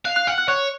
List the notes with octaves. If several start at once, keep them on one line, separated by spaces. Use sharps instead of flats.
F5 F#6
F#6
F#5 F6
F#6
C#5 F#6